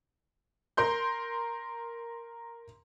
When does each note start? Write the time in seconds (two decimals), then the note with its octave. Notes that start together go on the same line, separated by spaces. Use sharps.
0.77 A#4 C6 G6